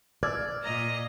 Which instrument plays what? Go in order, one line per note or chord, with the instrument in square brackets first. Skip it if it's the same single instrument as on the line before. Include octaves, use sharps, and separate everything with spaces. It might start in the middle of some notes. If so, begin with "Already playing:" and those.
[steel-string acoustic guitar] D5 [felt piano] E6 F6 G#6
[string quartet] A#2 D#5 A#5